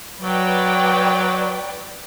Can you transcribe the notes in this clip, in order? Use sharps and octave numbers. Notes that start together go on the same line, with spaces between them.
F#3 B4 D5 G5